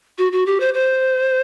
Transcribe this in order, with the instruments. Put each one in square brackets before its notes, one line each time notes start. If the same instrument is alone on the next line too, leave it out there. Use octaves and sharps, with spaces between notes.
[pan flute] F#4
F#4
G4
C5
C5